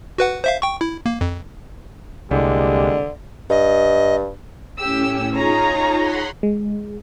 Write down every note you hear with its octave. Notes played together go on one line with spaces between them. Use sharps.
F#4 B4 F#5
C5 E5 F5
G5 C#6
E4
A#3
F2
C2 D3 G#3 A#3 G4
G2 D#5
A2 C#4 G4 E6
D#4 F4 G#4 C#5 A#5
F#5 B5 C6
G#3